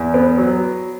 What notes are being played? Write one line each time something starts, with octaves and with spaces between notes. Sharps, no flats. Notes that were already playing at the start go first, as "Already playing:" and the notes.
Already playing: E2
B3
F#3